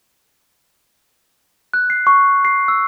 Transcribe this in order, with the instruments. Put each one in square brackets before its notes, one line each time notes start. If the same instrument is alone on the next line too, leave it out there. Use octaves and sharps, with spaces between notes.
[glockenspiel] F#6
C7
C#6
C7
E6